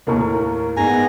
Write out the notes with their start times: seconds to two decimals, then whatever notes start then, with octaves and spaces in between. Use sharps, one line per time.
0.07 D#2 A2 A4 A#4 C#6
0.77 G#2 B3 G#5 A#5